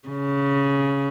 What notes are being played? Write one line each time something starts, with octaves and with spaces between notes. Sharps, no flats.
C#3